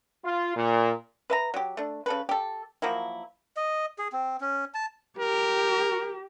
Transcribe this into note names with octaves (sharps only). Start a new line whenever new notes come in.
F4
A#2
B4 E5 A#5
F#3 G4
A3 D4
C#3 A4 B4
G4 A4
F3 F#3 A#3 E4
D#5
G#4
C4
C#4
A5
G4 A#4